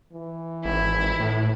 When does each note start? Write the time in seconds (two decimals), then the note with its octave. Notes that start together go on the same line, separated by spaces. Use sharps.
0.13 E3
0.65 G#1 E4
1.20 A2